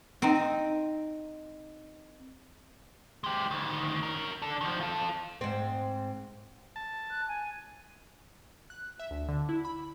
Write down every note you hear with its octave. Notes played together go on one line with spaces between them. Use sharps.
C4 D#4
G#3 G4
D2 D#3
C#4 A#4
D4 A4
D#3 F3
F4 A4
G#2 C4
A5
F#6
G#5
F#6
E5
D2
D3
E4
B5